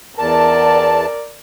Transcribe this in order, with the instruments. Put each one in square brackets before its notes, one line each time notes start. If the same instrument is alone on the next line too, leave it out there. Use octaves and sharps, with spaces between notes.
[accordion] E2 A5 [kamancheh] A#4 D5